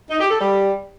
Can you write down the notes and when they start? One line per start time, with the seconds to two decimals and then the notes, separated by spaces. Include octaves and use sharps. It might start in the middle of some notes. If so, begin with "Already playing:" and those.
0.10 D#4
0.20 G4
0.30 A4
0.41 G3